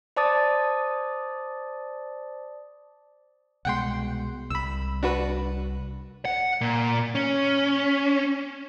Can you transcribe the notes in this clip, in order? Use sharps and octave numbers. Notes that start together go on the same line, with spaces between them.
C5 D5 A5 D6 D#6 A6
C2 B2 G#3 F#5 G5 C6
C2 B5 E6
D4 F#4 B4
F#5
A#2
C#4